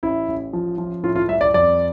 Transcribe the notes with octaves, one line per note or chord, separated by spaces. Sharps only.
A1 E4
A1
F3
F3
A2 F4
F4
G3 E5
D5
F2 D5